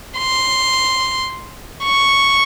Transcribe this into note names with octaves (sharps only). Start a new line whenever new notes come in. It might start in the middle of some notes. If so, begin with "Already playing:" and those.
C6
C#6